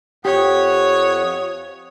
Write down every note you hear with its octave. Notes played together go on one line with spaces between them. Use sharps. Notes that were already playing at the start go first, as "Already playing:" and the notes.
F2 G4 C#5 F#5 D#6